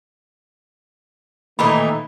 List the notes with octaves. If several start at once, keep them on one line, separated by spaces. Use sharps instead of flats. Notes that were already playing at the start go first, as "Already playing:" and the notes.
A#2 D#3 E3 A3 D#4 B5